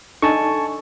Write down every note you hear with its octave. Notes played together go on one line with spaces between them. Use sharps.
D4 D#4 A4 G#5 A5 C#6